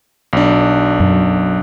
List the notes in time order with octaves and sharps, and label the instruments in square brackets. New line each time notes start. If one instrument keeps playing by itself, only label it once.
[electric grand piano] B1 D4
[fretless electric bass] F#2